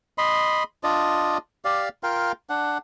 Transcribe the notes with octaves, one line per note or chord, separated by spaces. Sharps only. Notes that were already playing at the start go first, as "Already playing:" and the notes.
D#5 B5 C6
D4 F4 D5 D#5
G4 D5 F5
F4 A#4 F5 G5
D4 F#5